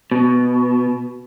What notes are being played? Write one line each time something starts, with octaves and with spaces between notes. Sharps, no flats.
B2